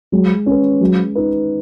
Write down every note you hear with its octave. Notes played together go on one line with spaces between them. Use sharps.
F#3 G#3
C#4 B4
F#3 G#3
D#4 B4